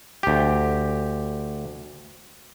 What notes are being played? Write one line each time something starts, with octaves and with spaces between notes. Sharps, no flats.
D2 G4